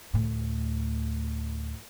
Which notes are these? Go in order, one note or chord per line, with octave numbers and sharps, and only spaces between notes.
D2 A2